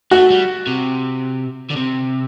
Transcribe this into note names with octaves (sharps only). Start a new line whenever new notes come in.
A3 F#4
G3
C3
D3
C3